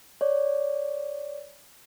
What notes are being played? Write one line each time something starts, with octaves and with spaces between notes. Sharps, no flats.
C#5 D5